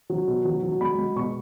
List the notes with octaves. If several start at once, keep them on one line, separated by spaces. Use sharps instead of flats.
F#3
B2
F#3
F#3
G#3 B5
G#3
B2 C#6